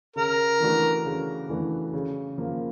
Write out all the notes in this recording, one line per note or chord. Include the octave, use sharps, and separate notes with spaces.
C#3 A#4
E3 A3 D4 F#4
C#3
E3 A3 D4 F#4
C#3
F3 A#3